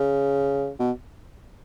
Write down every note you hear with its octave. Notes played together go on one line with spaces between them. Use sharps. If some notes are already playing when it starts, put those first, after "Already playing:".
Already playing: C#3
B2